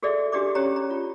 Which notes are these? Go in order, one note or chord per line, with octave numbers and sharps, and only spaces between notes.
F#4 G#4 A4 D5 E5
D4 F#4 G4 D5 D6
C#4 G4 C#5 A#5
A#5
F4